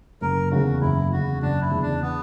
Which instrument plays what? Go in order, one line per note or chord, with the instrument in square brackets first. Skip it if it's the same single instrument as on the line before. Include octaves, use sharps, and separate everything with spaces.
[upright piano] F#1 [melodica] A#4
[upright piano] E2 C#3 [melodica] F#4
[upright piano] F#1 [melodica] E4
[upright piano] E2 C#3 [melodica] F#4
[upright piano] F#1 [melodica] D4
[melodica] E4
[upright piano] E2 C#3
[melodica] D4
B3